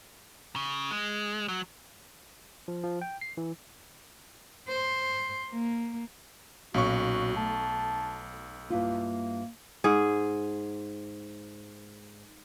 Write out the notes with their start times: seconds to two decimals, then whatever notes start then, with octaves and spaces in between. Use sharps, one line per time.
0.56 C#3
0.91 G#3
1.48 F#3
2.68 F3
2.83 F3
3.01 G5
3.21 C7
3.37 E3
4.68 C5
5.51 A#3
6.74 B1 A#2 C#4 F#4 C#6
7.36 A3 A5
8.70 G2 A#3 E4 F4
9.84 G#2 G#4